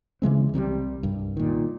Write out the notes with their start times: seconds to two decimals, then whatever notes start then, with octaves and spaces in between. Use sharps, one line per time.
0.22 C#3 E3 G#3 C4
0.54 C2 C3 F#3 G3
1.03 C2 G2
1.37 A#2 D#3